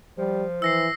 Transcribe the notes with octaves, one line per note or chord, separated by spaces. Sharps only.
F3 G3
E3 E6 A#6 C7